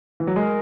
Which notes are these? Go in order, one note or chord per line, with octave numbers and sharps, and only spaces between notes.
E3
F#3
G#3 A#4